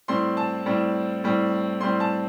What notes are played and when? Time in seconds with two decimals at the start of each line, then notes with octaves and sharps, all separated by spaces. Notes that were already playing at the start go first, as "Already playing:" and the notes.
0.08 A2 G3 C4 C6
0.37 A5
0.66 A2 G3 C4
1.24 A2 G3 C4
1.81 A2 G3 C4 C6
2.00 A5